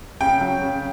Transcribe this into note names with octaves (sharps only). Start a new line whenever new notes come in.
C#3 G5
F#3
C#3